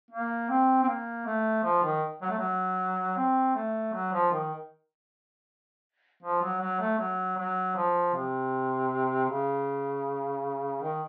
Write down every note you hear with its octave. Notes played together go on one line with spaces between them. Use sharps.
A#3
C4
C4
A#3
A3
F3
D#3
F#3
A3
F#3
C4
A3
F#3
F3
D#3
F3
F#3
F#3
A3
F#3
F#3
F3
C3
C#3
D#3